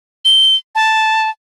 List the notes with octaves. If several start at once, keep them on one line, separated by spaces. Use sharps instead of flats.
G7
A5